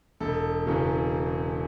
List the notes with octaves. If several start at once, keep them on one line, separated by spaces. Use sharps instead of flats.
E1 A4
E2 C#3 F#3